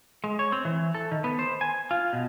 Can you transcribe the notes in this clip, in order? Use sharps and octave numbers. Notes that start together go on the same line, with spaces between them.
G#3
C#5
C4
E3
A4
D#3
B3
C5
G#5
F4
B2